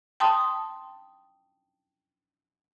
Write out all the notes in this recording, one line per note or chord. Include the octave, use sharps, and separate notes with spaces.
G5 A5 C6 D#6